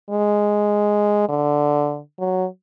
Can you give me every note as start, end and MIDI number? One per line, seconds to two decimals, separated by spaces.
0.10 1.24 56
1.29 1.99 50
2.19 2.46 54